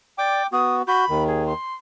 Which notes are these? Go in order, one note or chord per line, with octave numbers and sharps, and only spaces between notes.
D5 G5 D6
B3 F#4 D#6
F#4 B5 G6
D#2 D#3
G#4
C6